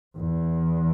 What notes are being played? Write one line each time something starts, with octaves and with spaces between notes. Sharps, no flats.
E2